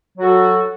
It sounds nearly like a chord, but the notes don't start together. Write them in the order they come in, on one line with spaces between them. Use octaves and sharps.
F#3 F#4 A4